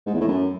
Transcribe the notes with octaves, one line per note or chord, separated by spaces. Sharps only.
G#2
E2
A2
F#2